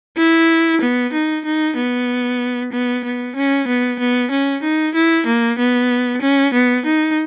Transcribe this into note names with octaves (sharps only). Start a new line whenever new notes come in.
E4
B3
D#4
D#4
B3
B3
B3
C#4
B3
B3
C#4
D#4
E4
A#3
B3
C#4
B3
D#4